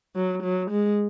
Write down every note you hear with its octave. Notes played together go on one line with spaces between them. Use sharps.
F#3
F#3
G#3